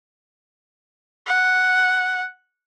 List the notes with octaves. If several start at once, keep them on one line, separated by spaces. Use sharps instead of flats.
F#5